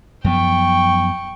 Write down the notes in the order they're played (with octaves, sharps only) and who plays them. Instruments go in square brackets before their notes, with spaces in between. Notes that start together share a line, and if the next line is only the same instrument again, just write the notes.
[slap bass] F#2 F3 B3 [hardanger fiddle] G5 C#6